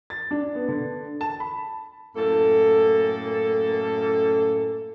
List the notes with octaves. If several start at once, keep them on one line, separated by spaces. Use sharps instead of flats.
A6
D4
B3
D3
A5
B5
F#2 A2 A#3 A4